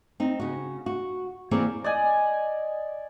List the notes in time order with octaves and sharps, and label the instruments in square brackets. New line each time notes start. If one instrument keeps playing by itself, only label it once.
[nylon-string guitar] C4 D#4
C#3 F#4
F#4
E3 A#3 C4 G#4 C#5 D5
[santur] D5 D#5 G#5